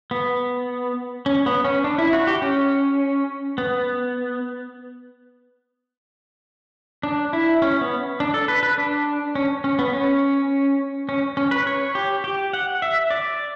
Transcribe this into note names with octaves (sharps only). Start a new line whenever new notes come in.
B3
C#4
B3
C#4
D4
E4
F#4
G4
C#4
B3
D4
E4
C#4
B3
D4
A4
B4
B4
D4
C#4
C#4
B3
C#4
C#4
C#4
B4
C#5
G4
G4
F#5
E5
D5